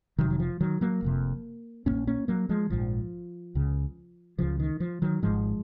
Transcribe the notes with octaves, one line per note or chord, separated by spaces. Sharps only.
F1 F2 C3 D#3 F#3
F#3
F3
D#3 F#3
F#3 A#3
F1 F2 C3
A#1 G#2 A#3 C#4
A#3 C#4
F#3 A#3
F3 G#3
A#1 G#2 F3
C#2 C#3
C#2 C#3 F3
D#3
F3
D#3 F#3
G#1 G#2 F3 G#3